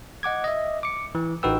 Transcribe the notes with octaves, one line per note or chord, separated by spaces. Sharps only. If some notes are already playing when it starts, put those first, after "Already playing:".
D#5 F#5 D6 G#6
D#5 E5
D6 C#7
E3
A1 D#4 F#4 B4 G5 E6